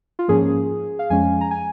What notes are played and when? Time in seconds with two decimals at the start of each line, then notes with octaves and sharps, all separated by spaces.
0.19 F4
0.28 G#2 F3 A#3 C#4 G#4
0.99 F5
1.10 F2 F3 G#3 C#4 G#5
1.41 A#5
1.51 G#5